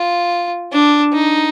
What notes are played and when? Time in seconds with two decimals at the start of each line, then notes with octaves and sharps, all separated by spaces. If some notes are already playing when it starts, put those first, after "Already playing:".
Already playing: F4
0.72 D4
1.14 D#4